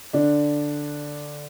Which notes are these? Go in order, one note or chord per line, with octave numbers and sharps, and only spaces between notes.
D3 D4